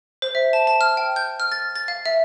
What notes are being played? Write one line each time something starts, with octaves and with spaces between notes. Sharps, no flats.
C5
E5
A5
A5
F6
G5
G6
F6
A6
A6
F5
E5